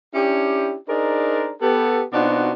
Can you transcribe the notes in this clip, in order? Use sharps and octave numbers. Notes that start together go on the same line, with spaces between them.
C#4 D4 E4 G4
D4 D#4 G#4 A#4 C5 D5
B3 G4 A4
B2 C4 D4 D#4 F4 F#4